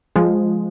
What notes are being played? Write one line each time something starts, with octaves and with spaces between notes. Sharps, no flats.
F3 G#3